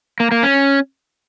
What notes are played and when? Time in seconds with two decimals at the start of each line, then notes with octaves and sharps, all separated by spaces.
0.20 A#3
0.32 A#3
0.43 C#4